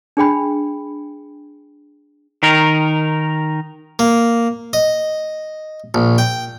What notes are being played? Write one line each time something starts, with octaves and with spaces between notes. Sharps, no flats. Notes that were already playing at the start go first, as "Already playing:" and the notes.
D4 G#4 G5 B5
D#3 D#4 A#4
A#3
D#5
A#1
G5